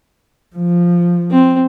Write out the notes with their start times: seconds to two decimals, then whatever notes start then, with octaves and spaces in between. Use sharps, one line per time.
0.56 F3
1.31 C4